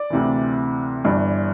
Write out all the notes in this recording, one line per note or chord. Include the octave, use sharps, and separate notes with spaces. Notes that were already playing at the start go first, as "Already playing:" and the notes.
Already playing: D5 D6
D2 C3 E3
G1 G2 E3